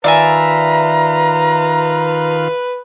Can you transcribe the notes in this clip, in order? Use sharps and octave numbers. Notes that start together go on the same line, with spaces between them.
D#3 F4 B4 D5 E5 F5 G#5 A#5